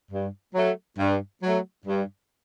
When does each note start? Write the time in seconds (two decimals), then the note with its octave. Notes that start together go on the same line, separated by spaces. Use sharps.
0.12 G2
0.55 F#3 A3
0.99 G2
1.43 F#3 A3
1.86 G2